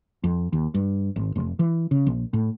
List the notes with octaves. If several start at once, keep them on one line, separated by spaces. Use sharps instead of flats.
F2
D#2
G2
G#1
F1
E3
C#3
A#1
A2